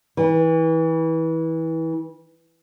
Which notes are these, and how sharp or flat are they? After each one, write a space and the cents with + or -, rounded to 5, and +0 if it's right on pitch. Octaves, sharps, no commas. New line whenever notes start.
E3 -25